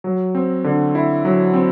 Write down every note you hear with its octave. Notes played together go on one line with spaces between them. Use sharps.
F#3
C4
D3
E4
F#3
C4